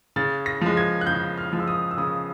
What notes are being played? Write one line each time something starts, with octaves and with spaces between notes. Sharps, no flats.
C#3 A6
A#6
F3 G#3
G#6
F#6
C#3 G6
F6
F3 G#3
E6
D#6
E6
C#3 D#6